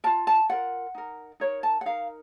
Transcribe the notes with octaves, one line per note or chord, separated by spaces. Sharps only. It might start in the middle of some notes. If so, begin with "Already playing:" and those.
F4 A#4 A5
A5
F4 A#4 F#5
D#4 A#4
D#4 A#4 C#5
A5
F#5
D#4 A#4 F5